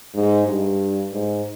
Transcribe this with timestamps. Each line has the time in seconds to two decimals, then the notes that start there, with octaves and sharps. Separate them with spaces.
0.15 G#2
0.47 G2
1.12 G#2